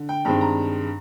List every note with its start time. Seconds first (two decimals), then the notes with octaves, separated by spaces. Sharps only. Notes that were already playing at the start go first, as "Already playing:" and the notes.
Already playing: D3
0.09 G5
0.25 G2 D#3 G#3 C4 G5
0.41 A#5